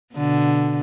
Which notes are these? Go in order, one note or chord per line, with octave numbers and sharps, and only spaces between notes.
B2 D3